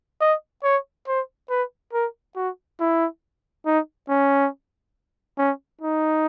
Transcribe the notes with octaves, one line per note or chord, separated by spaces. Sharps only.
D#5
C#5
C5
B4
A#4
F#4
E4
D#4
C#4
C#4
D#4